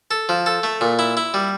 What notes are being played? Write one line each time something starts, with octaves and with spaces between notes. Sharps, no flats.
A4
F3
A4
A3
A#2
E4
E4
G3